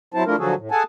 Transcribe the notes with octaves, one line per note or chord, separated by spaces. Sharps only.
F#3 C4 E4 C5 A5
F3 A3 D4 E4 F4 A#4
D3 F3 F#3 F#4 G#4 A4
A2
G#4 A4 F#5 G#5 A5